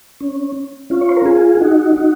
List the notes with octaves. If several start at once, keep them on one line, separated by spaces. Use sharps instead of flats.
C#4
C#4 F4
C#5
C5
A#4
F4 G#4
G#4
D#4 F#4
D#4 F#4